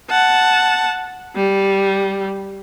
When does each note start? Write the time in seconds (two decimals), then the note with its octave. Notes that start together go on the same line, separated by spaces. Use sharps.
0.10 F#5 A5
1.36 G3